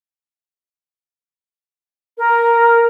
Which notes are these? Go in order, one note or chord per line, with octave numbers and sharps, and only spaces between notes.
A#4